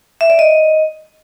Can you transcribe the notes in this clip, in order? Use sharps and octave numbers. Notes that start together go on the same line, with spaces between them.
E5
D5
D#5